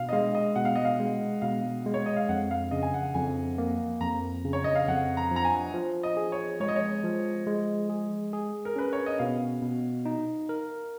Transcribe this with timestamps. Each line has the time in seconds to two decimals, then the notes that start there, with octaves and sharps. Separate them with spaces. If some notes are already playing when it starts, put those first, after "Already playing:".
Already playing: B2 F5
0.09 D#5
0.13 G#3 F5
0.35 D#5
0.56 B2 F#5
0.65 F5
0.75 D#5
0.85 F5
1.00 G#3
1.42 B2 F5
1.86 G#3
1.94 C#5
2.06 D#5
2.17 F5
2.29 F2 F#5
2.51 F5
2.71 C#3 D#5
2.83 G#5
2.94 F#5
3.15 F2 G#5
3.58 A#3
4.01 F2 A#5
4.44 C#3
4.53 C#5
4.64 D#5
4.75 F5
4.88 F2 F#5
5.17 A#5
5.31 F3 A#5
5.45 G#5
5.74 F3
6.03 D#5
6.17 G#4
6.32 C#5
6.60 G#3 C#5
6.68 D#5
6.76 C#5
7.04 F3
7.47 G#3
7.90 G#4
8.33 G#4
8.65 A#4
8.76 C#4 B4
8.93 C#5
9.06 D#5
9.19 B2 F5
9.62 B2
10.05 D#4
10.49 A#4